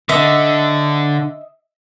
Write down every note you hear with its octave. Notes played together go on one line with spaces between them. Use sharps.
D3 D#5 E5